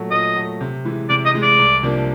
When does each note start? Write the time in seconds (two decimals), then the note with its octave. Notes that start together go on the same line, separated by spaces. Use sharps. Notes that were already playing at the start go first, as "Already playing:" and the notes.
Already playing: A#2 F#3 A3
0.11 A#2 D#5
0.36 F#3 A3
0.61 C3
0.85 E3 G#3
1.10 C3 D5
1.26 D#5
1.34 E3 G#3
1.43 D5
1.59 C2
1.83 C3 F3 A#3 D4